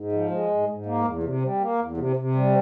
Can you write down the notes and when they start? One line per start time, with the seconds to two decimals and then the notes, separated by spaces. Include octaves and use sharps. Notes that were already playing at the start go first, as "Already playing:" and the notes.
Already playing: G#2
0.12 F3
0.31 G#3
0.50 G#2
0.67 G#2
0.86 A#3
1.05 E2
1.23 C3
1.42 G3
1.60 A#3
1.80 E2
1.97 C3
2.16 C3
2.35 G3